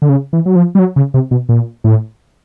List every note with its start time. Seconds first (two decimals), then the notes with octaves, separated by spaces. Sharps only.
0.02 D3
0.09 C#3
0.33 E3
0.46 F#3
0.56 F3
0.75 G3
0.79 F#3
0.96 C#3
1.14 C3
1.31 B2
1.49 A#2
1.84 A2